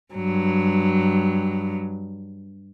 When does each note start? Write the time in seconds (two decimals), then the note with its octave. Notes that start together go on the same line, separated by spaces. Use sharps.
0.14 G2 F#3